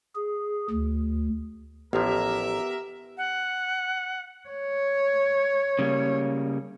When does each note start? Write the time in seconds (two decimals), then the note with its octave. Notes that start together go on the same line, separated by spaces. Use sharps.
0.16 G#4
0.70 D2
1.93 A1 F3 B3 G4 A#4 E5 A#5
3.17 F#5
4.49 C#5
5.79 C#3 G3 A#3